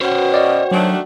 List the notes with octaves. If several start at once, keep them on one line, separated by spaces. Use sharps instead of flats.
B2 C#4 F#4 C5 C#5 F#5 G5
D5 D#5
D#3 F#3 A3 D4